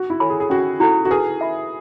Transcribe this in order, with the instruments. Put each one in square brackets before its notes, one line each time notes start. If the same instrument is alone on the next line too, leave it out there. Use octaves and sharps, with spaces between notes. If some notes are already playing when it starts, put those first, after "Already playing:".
Already playing: [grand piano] F#4
E4
[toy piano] A4 C#5 G#5 B5
[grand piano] G#4
G#4
[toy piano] C#4 [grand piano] F#4
[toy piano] E4 A4 [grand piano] F#4
[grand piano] F#4
[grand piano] G#4 [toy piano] B4
[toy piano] E5 B5